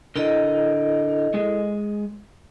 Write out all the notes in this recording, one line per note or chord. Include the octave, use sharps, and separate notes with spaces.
D3 E4 A4 A#4 D#5
G#3 G#4